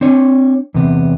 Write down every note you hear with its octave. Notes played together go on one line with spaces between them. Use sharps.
C4 D4 C#5
E2 C3 B3